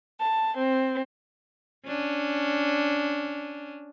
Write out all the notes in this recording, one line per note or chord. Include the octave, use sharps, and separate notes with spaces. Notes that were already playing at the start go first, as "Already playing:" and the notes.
A5
C4
C#4 D4